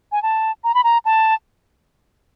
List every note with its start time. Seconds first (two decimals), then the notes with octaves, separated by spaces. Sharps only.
0.12 G#5
0.22 A5
0.64 A#5
0.74 B5
0.84 A#5
1.05 A5